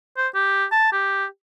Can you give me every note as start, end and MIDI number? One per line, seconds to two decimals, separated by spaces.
0.17 0.28 72
0.35 0.65 67
0.72 0.90 81
0.92 1.25 67